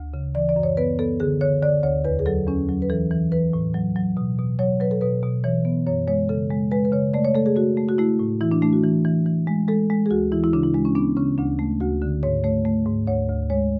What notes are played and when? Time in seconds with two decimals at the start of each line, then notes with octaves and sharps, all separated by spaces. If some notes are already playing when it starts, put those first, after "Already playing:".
Already playing: D2
0.14 C#3
0.35 E3 D5
0.49 D5
0.56 F#2
0.63 C#5
0.77 B3 B4
0.99 B3 A4
1.20 D3 G#4
1.41 D3 C#5
1.62 D3 D5
1.83 D2 C#5
2.05 E2 B4
2.19 G#4
2.26 F#3 A4
2.47 E2 C#4
2.69 F#3
2.82 B4
2.90 E3 A4
3.11 E3
3.32 E3 B4
3.53 A2
3.74 F#3
3.96 F#3
4.17 B2
4.39 B2
4.59 F#3 C#5
4.80 F#3 B4
4.91 A4
5.01 B2 B4
5.23 B2
5.44 E3 C#5
5.65 B3
5.87 F#2 C#5
6.08 G#3 C#5
6.29 C#3 A4
6.50 G#3
6.71 G#3 B4
6.85 B4
6.92 C#3 C#5
7.14 A3 D5
7.25 C#5
7.35 A3 A4
7.46 G#4
7.56 A3 F#4
7.77 A3
7.89 F#4
7.98 A3 E4
8.19 A2
8.41 E3 E4
8.52 D4
8.62 A3 D4
8.73 F#4
8.83 E3
9.05 E3
9.26 E3
9.47 G#3
9.68 G#3 A4
9.90 G#3
10.06 G#4
10.11 D2 F#4
10.32 E3 E4
10.44 E4
10.53 C#3 D4
10.63 E4
10.74 G#3 D4
10.85 C#4
10.95 B3 D4
11.17 C#3 C#4
11.38 D2 D4
11.59 A3
11.80 D2 F#4
12.02 D3
12.23 G#2 C#5
12.44 A3 C#5
12.65 A3
12.86 G#2
13.07 D2 C#5
13.29 D2
13.50 G#3 C#5